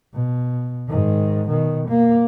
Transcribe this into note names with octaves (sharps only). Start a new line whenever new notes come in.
B2
G#2 D#3
B2 D#3
A#3